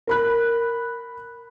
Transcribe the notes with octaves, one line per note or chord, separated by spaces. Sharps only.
A#4 B5 F#6